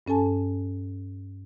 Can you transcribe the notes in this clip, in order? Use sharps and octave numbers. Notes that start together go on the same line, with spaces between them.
G2 C#4 A4 G#5 A5